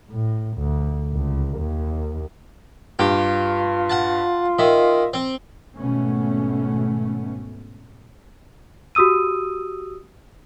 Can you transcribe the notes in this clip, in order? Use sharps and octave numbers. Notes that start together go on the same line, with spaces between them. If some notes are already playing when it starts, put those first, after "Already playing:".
A2
D2
C#2
D#2
G2 F4 G4
F#5 A5
D#3 D#5 E5
C4
G#1 B2 A3 B3 C#4
F#4 G4 D#6 E6 D#7